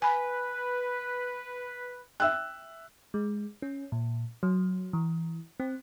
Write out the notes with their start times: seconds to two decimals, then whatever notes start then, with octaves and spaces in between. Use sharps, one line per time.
0.02 B4 G#5 B5
2.20 E5 G5 E6 F#6
3.14 G#3
3.62 C#4
3.92 A#2
4.43 F#3
4.93 E3
5.60 C4